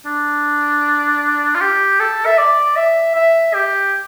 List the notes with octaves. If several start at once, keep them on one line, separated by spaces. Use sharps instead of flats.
D4
F4
G4
A4
E5
D5
E5
E5
G4